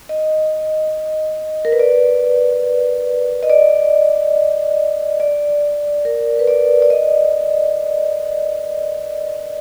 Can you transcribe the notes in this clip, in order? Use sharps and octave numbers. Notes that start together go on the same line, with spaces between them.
D#5
A#4
B4
D5
D#5
D5
D5
A#4
B4
D5
D5
D#5